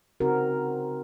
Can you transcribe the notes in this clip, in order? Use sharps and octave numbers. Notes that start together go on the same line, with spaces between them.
C#3 C4 D#4 F#4 A#4